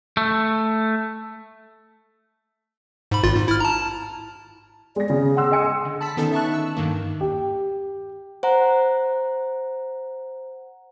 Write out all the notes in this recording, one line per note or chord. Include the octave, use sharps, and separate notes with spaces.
A3
G#2 B5
G#1 F4 A6
G#2
E4 F6
A5 A#5
G#3 D5 A#6
C#3 G#4
F#5 C6 E6
D#5 G#5 C#7
C6
D3
A5 B5 E6 B6
D#3 B3 C#4 D#4 A4
E5 A5 C#6 F#6
E6
G2 D#3 A#3
G4
C5 F#5 A#5